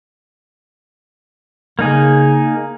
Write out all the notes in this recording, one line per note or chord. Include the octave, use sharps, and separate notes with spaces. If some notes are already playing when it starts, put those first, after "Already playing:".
C#3 A#3 D#4 G#4